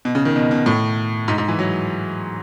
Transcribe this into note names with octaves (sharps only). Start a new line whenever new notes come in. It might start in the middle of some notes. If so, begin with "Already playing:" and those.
B2
C#3
D#3
B2
B2
A2
G#2
G#2
E3
F#3